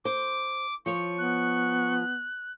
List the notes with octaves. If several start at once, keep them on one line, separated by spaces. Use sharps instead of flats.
C5 D6
F3 C#5 C#6
B3 F#6